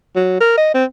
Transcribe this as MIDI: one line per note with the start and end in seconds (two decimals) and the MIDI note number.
0.16 0.37 54
0.41 0.56 70
0.58 0.70 75
0.74 0.85 60